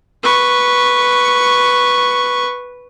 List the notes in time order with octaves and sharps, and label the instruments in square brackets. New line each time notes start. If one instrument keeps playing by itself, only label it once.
[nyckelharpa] B4 C#6